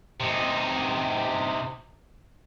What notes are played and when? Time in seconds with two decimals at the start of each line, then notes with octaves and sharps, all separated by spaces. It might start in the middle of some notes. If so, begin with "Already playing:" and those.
0.20 C3 D#4